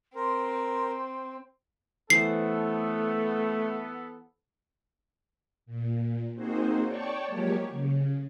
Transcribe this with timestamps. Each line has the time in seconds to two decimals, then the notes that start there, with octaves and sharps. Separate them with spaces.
0.15 C4 A#4 C6
2.10 E3 A3 B3 A4 C5 C7
5.66 A#2
6.35 A#3 C4 D#4 F#4 G#4 C5
6.86 C#5 D5 G5 A5 C#6
7.26 F3 F#3 G#3 A#3 G4 C#5
7.70 C#3